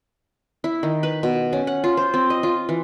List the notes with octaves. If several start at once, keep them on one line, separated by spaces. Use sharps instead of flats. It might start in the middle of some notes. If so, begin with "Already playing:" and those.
E4
D#3
B4
B2
C#4
F#5
F4
C5
C4
D#5
F4
E3